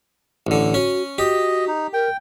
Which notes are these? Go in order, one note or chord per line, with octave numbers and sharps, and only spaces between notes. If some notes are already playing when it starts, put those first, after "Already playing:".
A1 D3
C#4 F#4
F#4 G4 D#5
D#4
A#4 G5